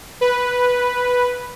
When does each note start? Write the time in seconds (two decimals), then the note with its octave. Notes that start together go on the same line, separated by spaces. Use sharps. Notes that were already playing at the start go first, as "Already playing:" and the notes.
0.21 B4